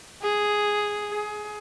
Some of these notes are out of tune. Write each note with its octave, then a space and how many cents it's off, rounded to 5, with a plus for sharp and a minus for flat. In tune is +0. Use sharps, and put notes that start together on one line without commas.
G#4 +0
G#4 +20